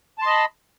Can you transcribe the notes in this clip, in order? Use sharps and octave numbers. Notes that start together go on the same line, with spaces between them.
D#5 A5 B5 C6